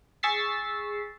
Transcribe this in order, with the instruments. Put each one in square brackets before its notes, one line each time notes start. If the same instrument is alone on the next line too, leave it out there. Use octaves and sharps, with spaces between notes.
[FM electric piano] G#4 C#6 E6 A6 B6 C7